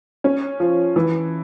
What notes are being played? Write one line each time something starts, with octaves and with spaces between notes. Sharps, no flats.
C#4
F3
E3